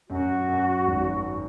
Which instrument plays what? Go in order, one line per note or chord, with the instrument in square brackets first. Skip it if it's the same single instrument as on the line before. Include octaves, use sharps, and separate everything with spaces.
[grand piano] F#2 [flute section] F#4
[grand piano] F#2
G#1